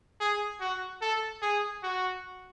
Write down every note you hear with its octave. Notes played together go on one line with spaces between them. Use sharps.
G#4
F#4
A4
G#4
F#4